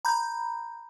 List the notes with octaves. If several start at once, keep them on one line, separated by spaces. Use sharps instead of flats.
A#5 B5 G6